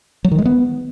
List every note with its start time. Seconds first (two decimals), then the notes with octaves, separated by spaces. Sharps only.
0.24 F#3
0.31 D#3
0.38 G#3
0.46 B3